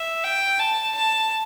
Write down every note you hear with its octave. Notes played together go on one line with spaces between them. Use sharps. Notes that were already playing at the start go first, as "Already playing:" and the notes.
Already playing: E5
G5
A5
A5